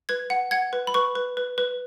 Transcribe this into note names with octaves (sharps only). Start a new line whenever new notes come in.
B4 G#6
F#5
F#5 G#6
B4
B5
B4 C#6
B4
B4
B4